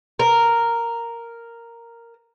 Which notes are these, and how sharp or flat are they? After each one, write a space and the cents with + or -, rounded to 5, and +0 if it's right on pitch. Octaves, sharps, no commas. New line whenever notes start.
A#4 -5